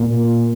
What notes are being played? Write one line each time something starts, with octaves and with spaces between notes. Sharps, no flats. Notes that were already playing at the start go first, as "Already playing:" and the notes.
Already playing: A#2